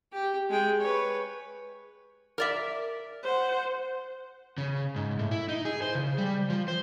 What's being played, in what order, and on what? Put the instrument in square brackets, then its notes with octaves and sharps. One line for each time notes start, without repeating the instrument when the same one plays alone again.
[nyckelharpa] G4 G5
G#3 G5
B4 C#5
[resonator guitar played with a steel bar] A#4 D5 E5
[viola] C5 F#5
[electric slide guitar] C#3
G#2
A2
E4
D#4
G#4
C5
C#3
G3
F3
C5